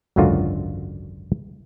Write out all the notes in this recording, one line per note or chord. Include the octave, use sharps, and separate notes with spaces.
G#1 C#2 F#2 D3 F4 F#4